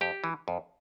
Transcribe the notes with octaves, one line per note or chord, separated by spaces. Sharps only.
F2 G4
E3
F2